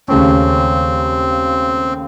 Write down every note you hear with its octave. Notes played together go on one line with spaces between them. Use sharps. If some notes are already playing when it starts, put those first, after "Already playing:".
D#2 C#3 A3 C4 C#4